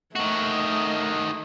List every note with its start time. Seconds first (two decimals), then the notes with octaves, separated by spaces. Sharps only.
0.15 D#3 A3 F#4 D#5